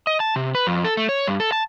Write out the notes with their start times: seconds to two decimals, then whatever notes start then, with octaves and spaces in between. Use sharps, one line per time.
0.07 D#5
0.20 A5
0.36 C3
0.55 B4
0.67 F2
0.85 A4
0.97 A3
1.09 C#5
1.27 G2
1.40 A4
1.52 A5